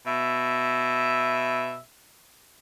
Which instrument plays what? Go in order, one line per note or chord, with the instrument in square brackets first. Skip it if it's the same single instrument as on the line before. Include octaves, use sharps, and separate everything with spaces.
[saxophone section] B2 E5